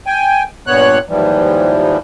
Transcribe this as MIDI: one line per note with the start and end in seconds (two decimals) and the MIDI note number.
0.06 0.44 79
0.06 0.44 80
0.67 0.98 43
0.67 0.98 46
0.67 0.98 59
0.67 0.98 73
0.67 0.98 90
1.09 1.97 39
1.09 1.97 44
1.09 1.97 52
1.09 1.97 53
1.09 1.97 55